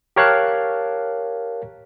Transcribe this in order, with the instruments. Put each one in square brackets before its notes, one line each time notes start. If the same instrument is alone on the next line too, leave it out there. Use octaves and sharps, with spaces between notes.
[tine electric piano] G4 A#4 C#5 F5 A5 F#6